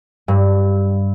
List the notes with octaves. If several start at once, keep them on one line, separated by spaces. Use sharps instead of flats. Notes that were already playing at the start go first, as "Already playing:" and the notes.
G2